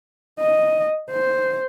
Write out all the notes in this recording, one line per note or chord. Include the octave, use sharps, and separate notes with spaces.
D#5
C5